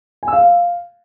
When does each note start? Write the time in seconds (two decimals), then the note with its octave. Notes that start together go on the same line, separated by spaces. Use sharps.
0.23 G#5
0.28 E6
0.33 F5